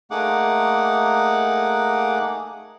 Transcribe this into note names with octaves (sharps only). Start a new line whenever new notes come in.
A3 A#3 D#4 G#4 F#5 D6